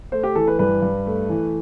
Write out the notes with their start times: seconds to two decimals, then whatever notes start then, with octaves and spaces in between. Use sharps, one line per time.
0.12 A3 C5
0.23 G4
0.35 E3 A4
0.47 B4
0.59 G2 B4
0.82 G2
1.06 A3
1.30 E3